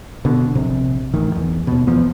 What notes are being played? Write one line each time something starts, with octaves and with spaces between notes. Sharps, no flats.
B2 D3
A#1 C3
A1 D#3
E2
D#2 B2
E2 E3 F3 B3